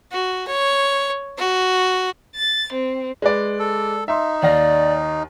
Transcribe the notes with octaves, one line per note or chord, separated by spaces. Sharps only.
F#4
C#5
F#4
A6
C4
G#3 B4 D5
A4
D#4 E5 C6
D#2 D5 F5 A#6